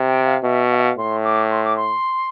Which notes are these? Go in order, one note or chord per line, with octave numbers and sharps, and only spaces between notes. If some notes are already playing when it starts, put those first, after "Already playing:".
Already playing: C3
G5
F5
B2 E5
F5
E5
F5
A2 C6
D6
C6
D6
C6